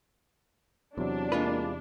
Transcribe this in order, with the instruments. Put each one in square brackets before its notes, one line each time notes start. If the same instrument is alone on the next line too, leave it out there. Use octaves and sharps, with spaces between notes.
[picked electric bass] E2 C3 [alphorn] F#3 [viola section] D4
[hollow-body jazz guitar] G#3 F4 B4 [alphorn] A#3